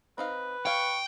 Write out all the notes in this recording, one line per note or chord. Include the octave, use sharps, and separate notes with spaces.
C4 D#4 B4 F5
C#5 F5 G5 C#6